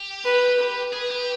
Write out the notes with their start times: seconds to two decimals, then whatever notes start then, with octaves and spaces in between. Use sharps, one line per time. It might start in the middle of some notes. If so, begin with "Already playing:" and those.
Already playing: G4
0.25 B4
0.59 B4
0.93 G#4 B4
1.11 G4